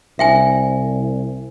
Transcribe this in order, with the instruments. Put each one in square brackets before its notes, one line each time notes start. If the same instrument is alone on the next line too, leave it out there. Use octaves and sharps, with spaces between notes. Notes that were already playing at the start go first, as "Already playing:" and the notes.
[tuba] C2 [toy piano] E5 G5 G#5